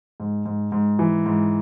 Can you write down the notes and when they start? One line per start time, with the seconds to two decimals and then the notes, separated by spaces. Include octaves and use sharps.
0.20 G#2
0.45 G#2
0.72 G#2
0.99 E3
1.26 G#2